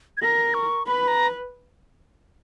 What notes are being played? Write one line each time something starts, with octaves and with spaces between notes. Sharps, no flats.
G#6
A#4 A#6
C#6
B4 B5
A#5